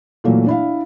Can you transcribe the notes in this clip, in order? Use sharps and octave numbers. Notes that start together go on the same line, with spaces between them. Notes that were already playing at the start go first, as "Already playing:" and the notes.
A#2 E3 F#3 A3 A#3
D4 E4 F5